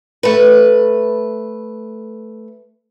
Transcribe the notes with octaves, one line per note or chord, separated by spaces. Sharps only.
A3 B4